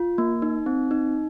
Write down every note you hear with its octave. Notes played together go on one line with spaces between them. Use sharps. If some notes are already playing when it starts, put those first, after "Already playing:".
Already playing: F4
A#3
D#4
C4
D#4